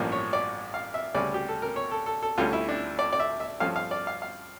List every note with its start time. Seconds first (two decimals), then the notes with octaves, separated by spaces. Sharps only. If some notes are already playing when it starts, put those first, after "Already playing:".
Already playing: A1 G2 F3 A#3 C#4
0.12 C#5
0.33 D5
0.74 F5
0.94 E5
1.15 D2 C#3 G3 C#4 D5
1.34 G4
1.48 A4
1.62 A#4
1.76 C#5
1.91 A4
2.06 A4
2.23 A4
2.38 D2 D3 G3 C#4 F4
2.53 E4
2.69 D4
2.99 D5
3.13 D5
3.20 E5
3.40 E5
3.60 G2 F3 A3 C#4 F5
3.76 F5
3.91 D5
4.07 F5
4.22 F5